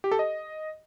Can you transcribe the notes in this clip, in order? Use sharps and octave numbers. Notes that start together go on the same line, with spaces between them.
G4
A4
D#5